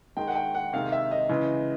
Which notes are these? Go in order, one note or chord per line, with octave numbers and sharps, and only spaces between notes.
D#3 G#3 G5
F#5
G5
F#5
C3 D#3 G#3 F5
E5
D#5
C#3 E3 G#3